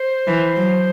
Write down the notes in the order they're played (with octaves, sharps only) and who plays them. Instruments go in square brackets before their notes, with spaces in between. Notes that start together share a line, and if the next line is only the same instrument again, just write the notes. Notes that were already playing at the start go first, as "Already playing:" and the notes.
Already playing: [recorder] C5
[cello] E3
F#3